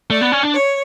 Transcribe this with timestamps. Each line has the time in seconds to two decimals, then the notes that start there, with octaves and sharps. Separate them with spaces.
0.10 A3 D5
0.21 B3
0.32 C#4
0.43 D4
0.54 C#5